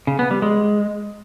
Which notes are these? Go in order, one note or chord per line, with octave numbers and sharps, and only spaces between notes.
C#3
B3
G3
G#3